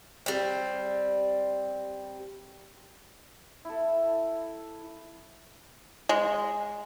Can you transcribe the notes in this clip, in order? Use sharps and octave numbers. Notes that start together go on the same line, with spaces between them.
G3 C4
E4 A4
G#3